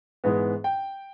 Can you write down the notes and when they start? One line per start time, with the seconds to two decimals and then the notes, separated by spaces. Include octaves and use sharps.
0.24 G#2 E3 G#3 B3
0.64 G5